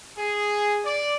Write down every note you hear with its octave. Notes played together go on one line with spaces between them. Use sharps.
G#4
D5